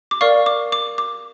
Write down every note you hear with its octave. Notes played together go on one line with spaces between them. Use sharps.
D6
A#4 D5 F5 C#6
D6
D6
D6